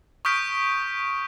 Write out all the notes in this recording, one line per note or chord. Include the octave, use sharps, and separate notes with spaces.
C#6 D#6 F6 G6 B6 D7